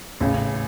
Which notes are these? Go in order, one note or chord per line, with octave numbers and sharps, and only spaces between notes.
A1 C#3